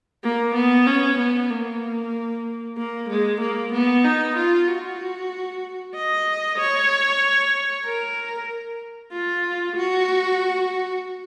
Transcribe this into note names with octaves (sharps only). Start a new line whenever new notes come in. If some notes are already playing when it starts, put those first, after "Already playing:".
A#3
B3
C#4
B3
A#3
A#3
G#3
A#3
B3
D#4
F4
F#4
D#5
C#5
A#4
F4
F#4